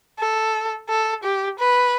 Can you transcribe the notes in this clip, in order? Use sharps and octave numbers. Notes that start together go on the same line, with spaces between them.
A4
A4
G4
B4